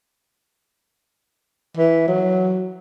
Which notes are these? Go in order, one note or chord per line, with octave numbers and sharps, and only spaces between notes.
E3
F#3